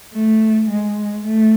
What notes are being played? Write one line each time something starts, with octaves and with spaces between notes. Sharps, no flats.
A3
G#3
A3